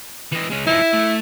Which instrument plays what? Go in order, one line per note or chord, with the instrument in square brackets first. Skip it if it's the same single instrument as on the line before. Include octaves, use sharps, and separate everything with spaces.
[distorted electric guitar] E3 D#5
G#3 C#4
[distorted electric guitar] F3 D#4 [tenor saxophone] E4
[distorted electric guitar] E5
A3